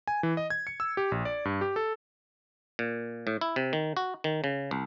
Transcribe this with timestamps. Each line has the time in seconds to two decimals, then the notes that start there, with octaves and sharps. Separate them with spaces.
0.07 G#5
0.23 E3
0.37 D#5
0.50 G#6
0.67 C#7
0.80 E6
0.97 G4
1.12 A#1
1.25 D5
1.45 G2
1.61 G4
1.76 A4
2.79 A#2
3.27 A2
3.41 E4
3.56 C3
3.73 D#3
3.97 F#4
4.24 D#3
4.44 C#3
4.71 C2